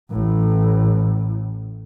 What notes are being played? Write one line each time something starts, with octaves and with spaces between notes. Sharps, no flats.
A1 A2